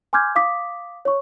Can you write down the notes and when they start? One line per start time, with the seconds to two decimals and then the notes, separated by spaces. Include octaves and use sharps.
0.13 G#5 C6 D6 F6 G6 G#6
0.35 F5 D6 D#6 B6
1.05 C#5 C#6